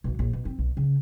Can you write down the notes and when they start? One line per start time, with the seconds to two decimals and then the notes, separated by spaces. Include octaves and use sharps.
0.04 B1 F#3
0.19 A#1
0.33 B2
0.45 C4
0.59 B1
0.77 C#3